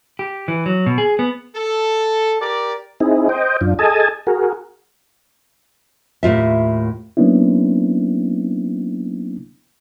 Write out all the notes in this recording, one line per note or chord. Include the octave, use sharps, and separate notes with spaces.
G4
E3
F#3
B2
G#4
B3
A4
G4 A#4 D5
C4 D#4 E4 G#4
C5 D#5 G5
F#2 D4 F4
G#4 A4 D#5 G#5 A5
F#4 G#4 A#4
D#2 A2 F4 E5
F#3 A#3 B3 C#4 D4 E4